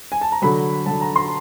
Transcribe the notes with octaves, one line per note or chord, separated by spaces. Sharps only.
G#5
A5
A#5
D3 F#3 B5
D3 F#3 A5
A#5
C6